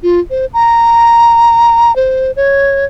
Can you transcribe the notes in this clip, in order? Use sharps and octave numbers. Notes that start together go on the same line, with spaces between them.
F4
C5
A#5
C5
C#5